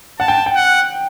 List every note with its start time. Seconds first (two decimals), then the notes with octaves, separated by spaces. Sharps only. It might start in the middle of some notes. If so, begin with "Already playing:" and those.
0.20 F#5 A5
0.28 G5
0.46 G5
0.55 F#5